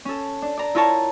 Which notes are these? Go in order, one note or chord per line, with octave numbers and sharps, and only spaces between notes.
C#4 A4
D4
D5 A#5
E4 F4 A#4 C#5 A5 A#5